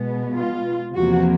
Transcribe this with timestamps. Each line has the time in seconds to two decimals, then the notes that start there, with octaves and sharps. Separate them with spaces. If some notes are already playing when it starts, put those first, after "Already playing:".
Already playing: B2 G#3 B3
0.34 F4
0.94 E2 C3 F3 A#3 F#4